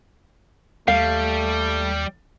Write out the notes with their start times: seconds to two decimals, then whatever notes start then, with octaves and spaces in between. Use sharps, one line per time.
0.88 D#2 G3 A3 F5